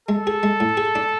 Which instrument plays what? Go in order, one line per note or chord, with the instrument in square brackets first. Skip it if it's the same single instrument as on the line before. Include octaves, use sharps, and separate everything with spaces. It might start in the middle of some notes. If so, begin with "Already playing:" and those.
[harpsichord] G#3 [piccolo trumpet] A4
[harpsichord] G#4
G#3
A2
G#4
D4